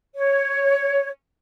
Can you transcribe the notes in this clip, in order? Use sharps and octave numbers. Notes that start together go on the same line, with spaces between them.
C#5